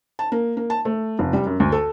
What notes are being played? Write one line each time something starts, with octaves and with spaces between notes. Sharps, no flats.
A5
A#3
A#3
A5
A3
F1
G3
F#2
D2
A4